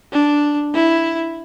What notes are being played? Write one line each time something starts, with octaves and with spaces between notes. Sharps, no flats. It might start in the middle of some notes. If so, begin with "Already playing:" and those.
D4
E4